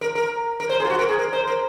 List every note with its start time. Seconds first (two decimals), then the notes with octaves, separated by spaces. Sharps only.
0.01 A#4
0.15 A#4
0.60 A#4
0.69 C5
0.80 G#4
0.85 F4
0.90 F#4
0.99 A#4
1.09 G#4
1.19 A#4
1.33 C5
1.47 A#4